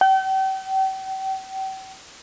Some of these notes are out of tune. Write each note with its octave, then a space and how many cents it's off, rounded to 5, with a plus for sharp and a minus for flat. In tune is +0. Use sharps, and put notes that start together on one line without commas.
G5 -40